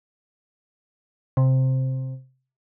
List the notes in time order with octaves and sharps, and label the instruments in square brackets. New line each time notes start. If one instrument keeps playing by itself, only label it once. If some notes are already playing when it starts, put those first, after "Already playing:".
[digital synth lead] C3